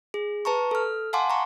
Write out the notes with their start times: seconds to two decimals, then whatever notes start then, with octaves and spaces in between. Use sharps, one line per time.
0.14 G#4
0.45 B4 A5 A#5 C#6
0.71 A4 F6
1.13 F5 F#5 G#5 A5 C6 D6
1.30 A#5 C#6